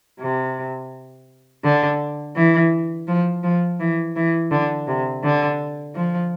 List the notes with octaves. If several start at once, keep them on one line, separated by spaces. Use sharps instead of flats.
C3
D3
E3
F3
F3
E3
E3
D3
C3
D3
F3